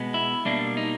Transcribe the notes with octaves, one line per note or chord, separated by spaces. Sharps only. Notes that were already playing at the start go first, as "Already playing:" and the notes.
Already playing: B2 G#3 B3
E4
B2 G3 A#3 D4
D#4